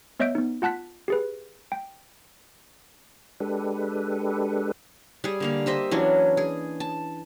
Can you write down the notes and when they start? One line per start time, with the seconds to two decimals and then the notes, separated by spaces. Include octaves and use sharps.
0.20 B3 C#5 D#5 E5 G6 D7
0.35 B3 D#4
0.62 F4 F#5 A5 F#6 B6
1.08 G4 G#4 B4
1.72 G5
3.40 G#3 D4 G4 A4 B4
5.24 G3 G#4
5.40 D3 A#3 F5
5.66 G4 C5 D#5 E5
5.91 E3 F#3 C#4 D4
6.37 G#4
6.80 A5